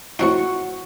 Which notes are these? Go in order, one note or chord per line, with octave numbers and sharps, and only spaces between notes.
A2 C4 D#4 F#4 C#6